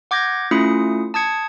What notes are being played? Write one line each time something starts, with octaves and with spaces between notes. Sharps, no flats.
F#5 D6 G6 G#6 A#6
A3 C#4 E4 F4 D#6 C#7
A5 D#6 G#6 C#7